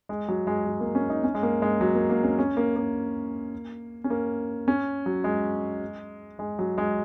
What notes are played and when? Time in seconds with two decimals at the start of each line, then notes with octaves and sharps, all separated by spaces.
0.09 G#3
0.28 F#3
0.47 G#3
0.66 F#3
0.80 A#3
0.95 C#4
1.10 D#4
1.24 C#4
1.34 G#3
1.43 A#3
1.62 G#3
1.81 F#3
1.95 A#3
2.10 A#3
2.24 C#4
2.39 C#4
2.57 A#3
2.76 A#3
4.04 C#4
4.10 A#3
4.68 C#4
5.06 F#3
5.24 G#3
6.39 G#3
6.59 F#3
6.78 G#3